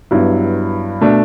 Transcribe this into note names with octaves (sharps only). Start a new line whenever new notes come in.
G2 F#3 B3 E4
B2 A3 D4